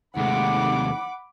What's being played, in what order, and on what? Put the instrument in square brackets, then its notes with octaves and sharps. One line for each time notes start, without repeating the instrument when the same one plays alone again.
[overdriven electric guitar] D#2 C3 [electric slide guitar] D#3 G#3 A3 [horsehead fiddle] F#5 [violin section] B5 D6